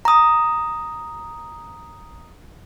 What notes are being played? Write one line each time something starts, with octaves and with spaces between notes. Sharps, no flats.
A#5 D#6